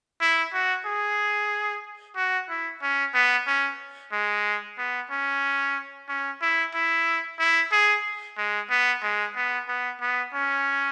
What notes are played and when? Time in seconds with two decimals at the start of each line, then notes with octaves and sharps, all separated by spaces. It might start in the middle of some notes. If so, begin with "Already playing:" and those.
0.21 E4
0.53 F#4
0.86 G#4
2.16 F#4
2.49 E4
2.82 C#4
3.14 B3
3.47 C#4
4.13 G#3
4.78 B3
5.11 C#4
6.09 C#4
6.42 E4
6.74 E4
7.39 E4
7.72 G#4
8.38 G#3
8.71 B3
9.03 G#3
9.36 B3
9.68 B3
10.01 B3
10.34 C#4